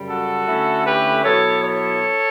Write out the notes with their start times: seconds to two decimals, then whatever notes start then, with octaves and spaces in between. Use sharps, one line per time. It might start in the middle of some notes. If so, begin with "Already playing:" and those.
Already playing: F#2 C#3 G3
0.10 F#4 A4
0.47 D3 A3 C#4 E4
0.86 G4 B4
1.24 B2 F#3 B3 E4 A4 C#5
1.63 A4 C#5